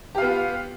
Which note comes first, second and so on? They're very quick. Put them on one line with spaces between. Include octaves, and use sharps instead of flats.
G4 F5 B3 F4